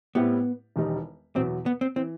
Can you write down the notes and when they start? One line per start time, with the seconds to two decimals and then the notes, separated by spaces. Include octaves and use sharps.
0.15 A2 G3 B3 C4 E4 G4
0.76 E1 E2 D#3 G3 D#4
1.35 E2 B2 F#3 C4
1.66 B3
1.81 C4
1.96 E3 C4